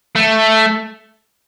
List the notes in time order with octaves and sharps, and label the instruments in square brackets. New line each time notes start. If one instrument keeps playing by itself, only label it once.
[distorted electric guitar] A3